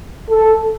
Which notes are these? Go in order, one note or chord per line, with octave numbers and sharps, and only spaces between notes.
A4